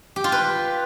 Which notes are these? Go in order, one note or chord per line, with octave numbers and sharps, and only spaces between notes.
G4
F4
B4